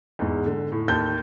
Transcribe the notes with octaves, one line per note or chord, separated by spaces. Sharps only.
E2 G#2
D3
A2
D#2 A5 G6